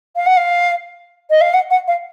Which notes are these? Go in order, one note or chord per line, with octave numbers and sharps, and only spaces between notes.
F5
F#5
F5
D#5
F5
F#5
F#5
F5